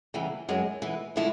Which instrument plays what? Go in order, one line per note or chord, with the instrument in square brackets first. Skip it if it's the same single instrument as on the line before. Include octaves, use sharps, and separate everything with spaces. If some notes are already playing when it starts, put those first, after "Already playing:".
[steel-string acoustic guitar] E2 C#3 E3 G3
F#2 D#3 G#3
E3 G#3 B3
D3 F3 G#3 C#4 E4